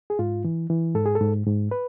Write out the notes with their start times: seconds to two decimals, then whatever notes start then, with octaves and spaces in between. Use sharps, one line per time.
0.10 G#4
0.19 G#2 F4
0.44 E3
0.70 E3
0.95 G#2 A4
1.06 G#4
1.15 A4
1.21 G#2
1.46 G#2
1.71 B4